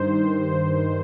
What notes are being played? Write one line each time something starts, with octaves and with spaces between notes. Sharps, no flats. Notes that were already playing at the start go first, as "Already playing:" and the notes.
Already playing: G2 D#3 C5